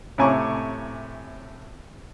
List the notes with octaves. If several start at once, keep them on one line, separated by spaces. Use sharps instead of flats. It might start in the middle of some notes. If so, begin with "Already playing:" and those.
A2 C3 G#5 A#5 C#6 D6